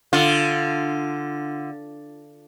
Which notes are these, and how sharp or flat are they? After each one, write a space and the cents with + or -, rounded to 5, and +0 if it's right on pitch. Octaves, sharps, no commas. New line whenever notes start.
D3 +0 F4 -15